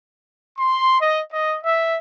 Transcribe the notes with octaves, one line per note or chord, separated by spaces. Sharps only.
C6
D#5
D#5
E5